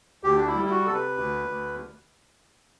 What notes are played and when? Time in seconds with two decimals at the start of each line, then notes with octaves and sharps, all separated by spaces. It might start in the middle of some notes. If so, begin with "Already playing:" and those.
0.23 D2 G4
0.36 D4
0.47 E4
0.55 G3
0.66 E4
0.71 F#4
0.86 C3 A4
0.94 B4
1.17 D2
1.48 D2